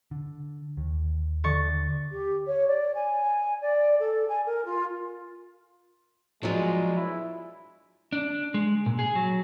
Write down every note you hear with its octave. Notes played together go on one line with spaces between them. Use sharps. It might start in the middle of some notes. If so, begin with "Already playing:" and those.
D3
D#2
D3 C#6 A6
G4
C#5
D5
G#5
D5
A4
G#5
A#4
F4
F3 F#3 G#3 B3 D4 F4
E4
D4
G#3
A#2
G#4
F#3